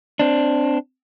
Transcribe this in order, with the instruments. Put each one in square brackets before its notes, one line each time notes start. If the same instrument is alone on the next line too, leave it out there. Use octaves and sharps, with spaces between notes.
[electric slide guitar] C4 D4